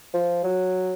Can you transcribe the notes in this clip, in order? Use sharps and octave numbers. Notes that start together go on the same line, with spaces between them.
F3
F#3